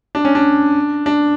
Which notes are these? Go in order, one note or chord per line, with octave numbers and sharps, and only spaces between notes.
D4
C#4
D4
D4